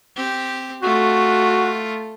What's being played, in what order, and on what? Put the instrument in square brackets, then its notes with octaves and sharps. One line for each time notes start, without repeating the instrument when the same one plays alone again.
[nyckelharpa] C4 G4
[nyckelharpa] A3 F4 [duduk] F#4